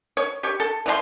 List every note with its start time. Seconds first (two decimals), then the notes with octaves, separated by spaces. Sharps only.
0.17 C#5
0.43 G4 C#5
0.60 A4
0.86 E3 A3 C6